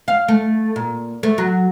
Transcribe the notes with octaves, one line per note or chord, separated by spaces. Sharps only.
F5
A3
A#2
A3
F#3